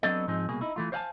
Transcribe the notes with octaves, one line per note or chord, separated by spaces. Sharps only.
F#3 B3 C4 D4 A4 D#5
G#2 F3 C4 D#4 G#4
C2 B2 A#3 G#4
D#4 E4
E3 A3 F4
C5 C#5 F5 F#5 G#5 A5